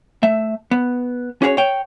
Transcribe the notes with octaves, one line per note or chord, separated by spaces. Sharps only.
A3 E5
B3
C#4 F#4 G#4 A#4 C#5
C#5 G5